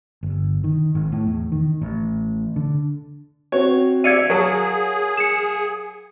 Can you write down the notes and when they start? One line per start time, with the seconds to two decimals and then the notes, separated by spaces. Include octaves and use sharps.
0.23 G1
0.64 D#3
0.95 G#1
1.12 A2
1.27 E2
1.52 D#3
1.81 A1
2.56 D3
3.52 C4 F#4 C#5
4.04 E2 D5 E5 F5 G#6 C#7 D#7
4.30 F#3 G#4 A#4 F5 A5
5.17 C#7 E7